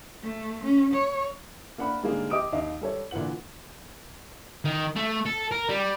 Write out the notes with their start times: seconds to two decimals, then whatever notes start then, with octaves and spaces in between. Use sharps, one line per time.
0.23 A3
0.63 C#4
0.94 C#5
1.78 A#3 D4 F#5 B5
2.02 G#2 D3 G3 G#3 A#3 G#4
2.30 G4 D#5 D6 D#6 D7
2.53 D#2 D#5 F5
2.81 G3 A4 C#5
3.11 A#2 D3 E3 F#5 F#7
4.65 D#3
4.96 A3
5.26 A4
5.51 A#4
5.69 G3